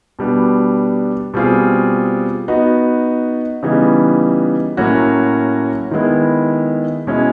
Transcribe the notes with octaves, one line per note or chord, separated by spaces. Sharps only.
B2 G3 B3 D4
B2 G3 C4 F4 G#4
B3 D#4 F#4
C#3 E3 G3 B3 D#4
A2 F#3 A#3 C#4 F#4
D#3 G#3 B3 E4
B2 G#3 C#4 E4